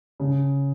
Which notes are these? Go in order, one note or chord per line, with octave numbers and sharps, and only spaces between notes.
C#3